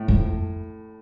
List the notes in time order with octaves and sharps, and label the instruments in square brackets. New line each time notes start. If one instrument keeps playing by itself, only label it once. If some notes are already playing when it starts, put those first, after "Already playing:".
Already playing: [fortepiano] A2
[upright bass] F2